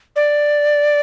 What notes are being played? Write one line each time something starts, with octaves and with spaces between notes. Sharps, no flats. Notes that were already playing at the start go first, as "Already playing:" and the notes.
D5